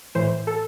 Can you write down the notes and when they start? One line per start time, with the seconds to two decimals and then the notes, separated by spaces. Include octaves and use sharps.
0.15 A2 E3 C5
0.47 A4